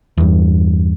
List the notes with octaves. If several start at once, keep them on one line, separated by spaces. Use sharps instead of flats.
E2 G2